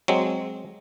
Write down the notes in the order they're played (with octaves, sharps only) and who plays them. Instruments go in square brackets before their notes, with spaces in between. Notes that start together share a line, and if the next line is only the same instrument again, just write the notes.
[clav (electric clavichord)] F#3 G#3 C4